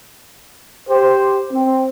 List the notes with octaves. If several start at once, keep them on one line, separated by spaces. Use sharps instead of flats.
G4 C5
C4